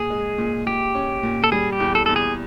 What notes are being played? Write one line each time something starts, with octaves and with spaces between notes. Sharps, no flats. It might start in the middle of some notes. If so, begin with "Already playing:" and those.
Already playing: A#2 G#4
G#3
A#2
A#2 G4
C#4
A#2
A4
G3 G#4
G4
E2
A4
E2 A4
G#4